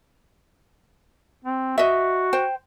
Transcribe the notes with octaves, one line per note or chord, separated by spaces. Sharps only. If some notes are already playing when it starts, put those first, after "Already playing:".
C4
F#4 D#5 E5
C5 G5